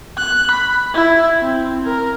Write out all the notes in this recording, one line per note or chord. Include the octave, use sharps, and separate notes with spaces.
F#6
B5
E4
C4
A#4